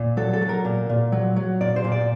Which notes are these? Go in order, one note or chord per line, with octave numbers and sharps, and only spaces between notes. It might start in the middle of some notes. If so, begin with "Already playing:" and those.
Already playing: A#2
F#3 A4
A4
F#3
A#4
A#2
A#2
F#3
F#3
A#2 D5
C5
A#2
D5